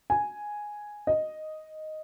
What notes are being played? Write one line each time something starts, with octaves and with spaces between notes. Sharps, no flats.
G#5
D#5